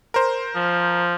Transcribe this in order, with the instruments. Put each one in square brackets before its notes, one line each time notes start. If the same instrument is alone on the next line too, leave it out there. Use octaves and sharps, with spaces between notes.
[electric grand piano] A#4 C5
[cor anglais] F3